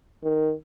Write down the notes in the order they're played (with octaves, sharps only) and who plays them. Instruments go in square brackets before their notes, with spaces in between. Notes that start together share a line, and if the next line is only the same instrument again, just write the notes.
[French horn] D#3